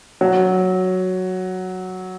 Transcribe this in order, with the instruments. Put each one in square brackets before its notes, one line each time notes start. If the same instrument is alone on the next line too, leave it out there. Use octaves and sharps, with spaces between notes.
[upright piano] F#3